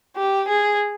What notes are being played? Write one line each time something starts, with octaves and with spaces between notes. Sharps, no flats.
G4
G#4